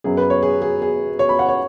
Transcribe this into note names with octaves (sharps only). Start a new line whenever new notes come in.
F#2 F#3 B3 G#4
B4
C#5
G#4
G#4
G#4
C#5
B5
F#5
C#5